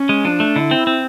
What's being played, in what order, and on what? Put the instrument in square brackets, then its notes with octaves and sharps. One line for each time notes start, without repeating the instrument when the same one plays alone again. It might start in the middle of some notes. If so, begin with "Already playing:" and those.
Already playing: [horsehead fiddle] C#4
[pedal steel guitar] G#3
[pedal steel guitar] F3 [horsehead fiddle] D4
[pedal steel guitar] A3
[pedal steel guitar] D3 [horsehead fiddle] E4
[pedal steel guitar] C4
C4